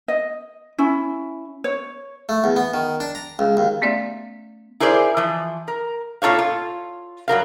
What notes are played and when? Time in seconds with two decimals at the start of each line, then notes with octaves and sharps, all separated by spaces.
0.08 D#5
0.78 C#4 E4
1.64 C#5
2.29 A3
2.44 E2
2.56 B3
2.74 D#3
3.00 D4
3.15 A#5
3.39 C#2
3.57 D#2
3.82 A3 B3 C#4 D5 E5 F5
4.80 E4 G#4 A#4 C5 D5
5.17 E3 F3
5.68 A#4
6.22 A#2 F4 A4 C#5 F5
6.39 F4
7.28 G2 F#3 A#4 F5